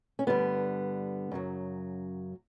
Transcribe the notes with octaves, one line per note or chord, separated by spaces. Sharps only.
C#4
G2 D3 G3 B3
F#2 C#3 F#3